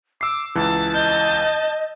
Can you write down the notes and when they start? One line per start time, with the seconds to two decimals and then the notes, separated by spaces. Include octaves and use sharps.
0.21 D6 E6 C7
0.55 C#2 E3 A5
0.94 D#5 G6